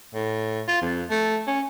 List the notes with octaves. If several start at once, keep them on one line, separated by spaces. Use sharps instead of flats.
A2
F4
F2
A3
C#4